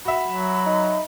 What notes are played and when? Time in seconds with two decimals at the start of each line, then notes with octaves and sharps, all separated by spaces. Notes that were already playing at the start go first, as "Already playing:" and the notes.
0.05 F#4 E5 B5
0.27 F#3
0.66 D#4